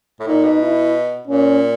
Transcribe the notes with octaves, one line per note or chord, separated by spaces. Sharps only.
A2
A#2 D#4
B2
E4
A#2 C#4